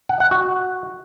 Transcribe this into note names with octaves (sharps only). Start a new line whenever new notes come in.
F#5
F#5
F#4